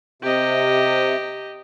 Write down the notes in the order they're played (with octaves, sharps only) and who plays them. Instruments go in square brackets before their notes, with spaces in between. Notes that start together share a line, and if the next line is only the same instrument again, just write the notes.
[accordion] C3 [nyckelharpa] G4 D#5